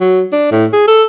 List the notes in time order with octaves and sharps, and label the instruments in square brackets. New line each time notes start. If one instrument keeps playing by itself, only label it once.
[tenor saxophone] F#3
D4
A2
G#4
A4